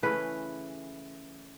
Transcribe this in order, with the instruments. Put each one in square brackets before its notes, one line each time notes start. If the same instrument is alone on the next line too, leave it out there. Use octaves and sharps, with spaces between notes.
[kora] C#3 E3 A3 C#4 B4